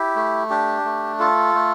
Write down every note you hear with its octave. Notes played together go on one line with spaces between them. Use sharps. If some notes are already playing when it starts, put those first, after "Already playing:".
Already playing: E4 G4
A3
D4 G4
A3
F4 A4
A3